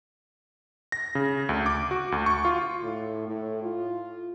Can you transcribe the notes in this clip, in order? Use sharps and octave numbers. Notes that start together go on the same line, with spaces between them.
A#6
C#3
D2
D6
F#4
D2
C#6
F4
A2
A2
F4